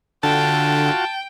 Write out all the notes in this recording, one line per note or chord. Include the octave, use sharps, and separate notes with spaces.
D3 F4 F#4 G5 A5